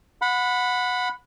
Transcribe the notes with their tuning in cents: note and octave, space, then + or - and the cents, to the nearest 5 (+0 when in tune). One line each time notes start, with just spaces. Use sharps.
F#5 -20 B5 +10